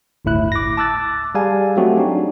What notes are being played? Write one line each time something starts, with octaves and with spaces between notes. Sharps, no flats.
G1 D2 A2 E4 F#6
D6 A#6
A5 D6 E6 F#6 A6
G3 G#4 F5 G#5 A5
F#3 A3 C4 F#4 G4
D4 D#4